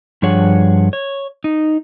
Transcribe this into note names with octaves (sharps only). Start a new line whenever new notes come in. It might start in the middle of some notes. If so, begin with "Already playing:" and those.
G2 F3 D4 G#4 C#5 F#5
C#5
D#4